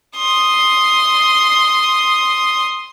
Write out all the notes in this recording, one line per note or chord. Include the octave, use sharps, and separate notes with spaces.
C6 D#6